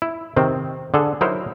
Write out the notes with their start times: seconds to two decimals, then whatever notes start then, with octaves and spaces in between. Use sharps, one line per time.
0.02 E4
0.36 C3 D#3 C4
0.94 D3 G#4 A4
1.21 F#3 D#4 E4 A#4 C5